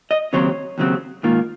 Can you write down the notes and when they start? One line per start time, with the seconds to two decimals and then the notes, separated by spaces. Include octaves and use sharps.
0.11 D#5
0.33 D#2 C#3 F#3 C4 C#5
0.78 D#2 C#3 F#3 C4
1.23 G#2 D#3 A#3 F4